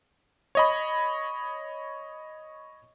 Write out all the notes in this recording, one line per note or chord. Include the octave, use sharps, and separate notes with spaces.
C#5 D#5 B5